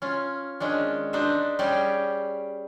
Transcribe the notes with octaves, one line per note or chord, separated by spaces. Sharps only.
C#4 F4
D#3 G#3 C#4 D4
D4 D#4 B4 C5 E5
G3 C#4 G4 G#4 D5